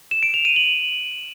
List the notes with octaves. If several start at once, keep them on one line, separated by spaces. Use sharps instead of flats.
E7
D7
F7
D#7
F#7